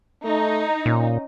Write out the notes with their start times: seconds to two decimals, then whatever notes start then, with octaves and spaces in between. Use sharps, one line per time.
0.24 A3 D#4
0.86 A#2 C#4